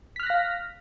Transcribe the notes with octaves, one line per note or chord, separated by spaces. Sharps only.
F5 F6 F#6 A#6 B6